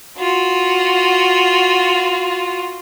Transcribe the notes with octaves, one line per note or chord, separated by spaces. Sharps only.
F4 F#4